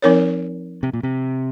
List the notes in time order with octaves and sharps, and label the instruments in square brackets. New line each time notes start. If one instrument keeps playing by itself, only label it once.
[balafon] F3 C4 D#4 A#4 C#5
[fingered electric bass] C3
A#2
C3